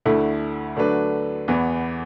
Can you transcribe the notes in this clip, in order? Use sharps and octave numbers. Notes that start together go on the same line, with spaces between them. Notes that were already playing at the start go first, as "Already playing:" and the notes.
D2 D3 A3 E4
D3 F#3 A3 D4 B4
E2 E3 B3